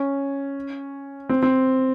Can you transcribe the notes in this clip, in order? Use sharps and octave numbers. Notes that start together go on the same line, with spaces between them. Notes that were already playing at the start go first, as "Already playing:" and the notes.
Already playing: C#4
C4
C4